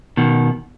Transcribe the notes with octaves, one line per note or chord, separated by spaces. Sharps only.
B2 D#3